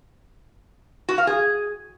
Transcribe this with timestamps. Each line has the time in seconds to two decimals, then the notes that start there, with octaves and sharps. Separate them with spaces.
1.09 F#4
1.18 F5
1.27 G#4